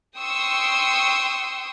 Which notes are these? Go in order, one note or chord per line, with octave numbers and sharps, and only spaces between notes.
G5 C6 C#6 D#6 E6